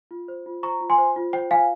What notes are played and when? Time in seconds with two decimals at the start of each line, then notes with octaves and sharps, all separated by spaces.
0.11 F4
0.28 C5
0.46 F4
0.63 C5 A#5 C#6
0.81 F4
0.90 G#5 C6
0.98 C5
1.16 F4
1.33 C5 G5
1.50 F4 F5 G#5